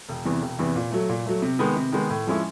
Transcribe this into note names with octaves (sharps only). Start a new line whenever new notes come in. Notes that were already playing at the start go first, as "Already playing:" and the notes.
E1
E2 C3 E3
E1
E2 C3 E3
A#2
F#3 A3
A#2
F#3 A3
C3
D#3 G#3 B3
C3
D#3 G#3 B3
A2
F3 G#3 C#4 E4